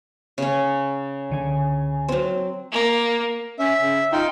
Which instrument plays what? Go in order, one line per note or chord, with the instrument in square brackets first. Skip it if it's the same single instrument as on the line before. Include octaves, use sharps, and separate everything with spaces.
[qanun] C#3 C#4
[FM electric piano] C#2 D3 G#5
[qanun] F#3 C4
[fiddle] A#3
[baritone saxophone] C#4 [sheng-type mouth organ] E5
[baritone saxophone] C#3
[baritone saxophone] D#4 [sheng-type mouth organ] F4 G5